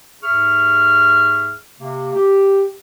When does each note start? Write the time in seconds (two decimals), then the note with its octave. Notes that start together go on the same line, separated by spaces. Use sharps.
0.23 D#2 G#2 G#4 E5 C#6 F6
1.81 C3 A#3
2.14 G4